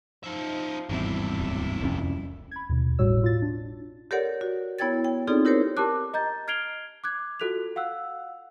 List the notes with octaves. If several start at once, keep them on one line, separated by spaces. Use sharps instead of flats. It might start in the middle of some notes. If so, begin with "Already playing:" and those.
F3 D#4 E5
G#1 E2 G2 C3 G3 E4
D1
D#1 C2 F2 A2 C#4
B5 G#6
D#2 B2
G#1 A2 G3 F#4 C#5 E6
F4 A6
D4
G4 A4 A#4 C#5 D5 F#5
F#4
B3 E4 C#5 G5 G#6 A6
G5
C4 D#4 F4 G#4 A4 D5
E4 G4 A#4 C5 C#5
G4 A#4 A5 D6 F#6
D#5 A#5 G6 A6
F6 G#6 C7 D7 F7 G7
D6 F#6 G#6
F4 F#4 A4 F#6 B6 F7
F5 F#5 E6 F#6